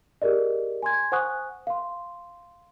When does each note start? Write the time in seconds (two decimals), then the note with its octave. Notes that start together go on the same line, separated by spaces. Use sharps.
0.22 G4 G#4 A#4 D5 D#5
0.83 G#5 C6 G#6
1.12 C5 F#5 G#5 C#6 D#6 F#6
1.67 F5 C6